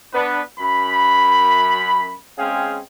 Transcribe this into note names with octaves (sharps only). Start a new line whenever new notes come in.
B3 D4 B4
F#2 B5
G#3 C4 C#4 G#4 F5 G5